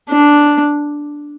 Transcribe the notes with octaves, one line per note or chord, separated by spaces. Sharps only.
D4